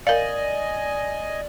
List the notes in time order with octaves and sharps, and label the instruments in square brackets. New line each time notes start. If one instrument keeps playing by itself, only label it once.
[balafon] A#4 F5 [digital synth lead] D5 [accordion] D#5 G#5